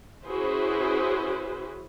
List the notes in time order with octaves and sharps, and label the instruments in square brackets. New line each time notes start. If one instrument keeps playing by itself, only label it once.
[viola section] C#4 E4 F#4 G#4 B4 C5